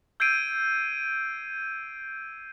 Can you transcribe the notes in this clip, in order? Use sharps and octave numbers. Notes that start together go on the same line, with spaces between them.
E6 G6 G#6 C7 D7 D#7